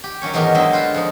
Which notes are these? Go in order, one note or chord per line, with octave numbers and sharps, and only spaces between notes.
G4
D#3 F#3 C#4 C#5
E2 G#2 D#3 B3 G4 A#4
D3 F#3 G#3 C5 D#5 E5
F4 B4 C5 F5
F2 F3 D#4